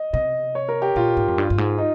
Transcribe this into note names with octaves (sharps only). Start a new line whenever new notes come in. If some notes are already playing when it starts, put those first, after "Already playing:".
Already playing: D#5
C3 D#5
C#5
A#4
G4
A#2 F4
G#2
F2
G2
G2
G#2
D#4